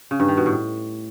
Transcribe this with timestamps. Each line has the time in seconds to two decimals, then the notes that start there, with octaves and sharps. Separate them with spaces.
0.11 C#3
0.20 G2
0.28 D#3
0.37 B2
0.46 A2